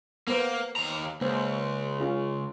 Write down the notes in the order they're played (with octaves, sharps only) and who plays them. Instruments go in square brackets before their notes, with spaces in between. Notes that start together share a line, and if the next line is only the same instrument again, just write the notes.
[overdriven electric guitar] A#3 [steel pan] B3 A#4 C5
[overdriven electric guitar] D#2 A#5
[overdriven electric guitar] C#2 [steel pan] A#3 C5
[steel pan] C#4 F4 G#4